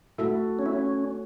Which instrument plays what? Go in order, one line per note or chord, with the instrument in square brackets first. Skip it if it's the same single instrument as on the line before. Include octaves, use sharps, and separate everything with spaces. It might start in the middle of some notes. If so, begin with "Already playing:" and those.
[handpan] A3 F#4 A4 [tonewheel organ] E4
[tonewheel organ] C#4
E4
C#4